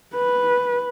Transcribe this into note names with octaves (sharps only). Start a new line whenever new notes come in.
B4